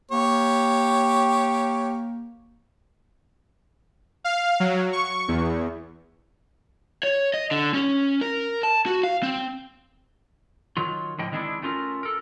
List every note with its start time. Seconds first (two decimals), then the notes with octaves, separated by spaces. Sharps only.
0.11 A#3 G4 C#5
4.24 F5
4.60 F#3
4.93 C#6
5.28 E2
7.03 C#5
7.34 D#5
7.51 D3
7.74 C#4
8.21 A#4
8.63 A5
8.86 F#4
9.03 F5
9.23 C4
10.77 D#3 F#3 F4
11.19 A2 D3 F3 D#5 G5
11.32 D3 D#3 G#3 C4 D4 E4
11.62 A3 C#4 F4 G4 A#4
12.03 A4 A#4